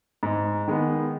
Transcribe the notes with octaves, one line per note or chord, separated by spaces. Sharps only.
G#2
D#3 G#3 B3